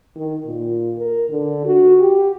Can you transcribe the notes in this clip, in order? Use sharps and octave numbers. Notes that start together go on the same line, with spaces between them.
D#3
A#2
A#4
D3
F#4
G4